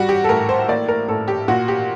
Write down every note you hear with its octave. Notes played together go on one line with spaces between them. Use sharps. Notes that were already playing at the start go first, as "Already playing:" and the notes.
Already playing: G3 F#4
G4
A4
A2 A#4
C5
A#3 D5
A#4
A2 A4
G4
A#2 F#4
G4